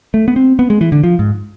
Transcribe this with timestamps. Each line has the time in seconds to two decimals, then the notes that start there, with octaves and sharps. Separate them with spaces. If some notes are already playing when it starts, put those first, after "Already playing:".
0.14 A3
0.28 B3
0.36 C4
0.59 B3
0.70 G#3
0.81 E3
0.92 D3
1.03 F3
1.19 G#2